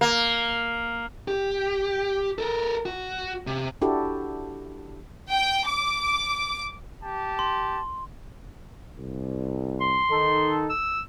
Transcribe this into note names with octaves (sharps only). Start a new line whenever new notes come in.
A#3
G4
A4 A#4
F#4
C3
D4 E4 F#4 G4 A4
G5
D6
G4 A5
C6
C2
C6
D#3 D#4 A4
E6